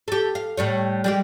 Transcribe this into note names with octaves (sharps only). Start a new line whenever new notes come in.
G4 A4
F5
A2 G3 C#5
G3 G#3 G4